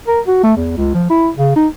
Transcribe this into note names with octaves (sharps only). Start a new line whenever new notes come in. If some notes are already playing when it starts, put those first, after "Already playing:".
A#4
F#4
A3
E2
C#2
F3
E4
C#3
D#4